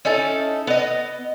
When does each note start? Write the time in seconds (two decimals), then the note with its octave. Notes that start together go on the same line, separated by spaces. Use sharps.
0.05 C#4 D#4 E4 A4
0.67 B3 D#5